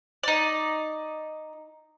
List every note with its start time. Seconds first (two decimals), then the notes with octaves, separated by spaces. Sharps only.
0.23 D#4 D5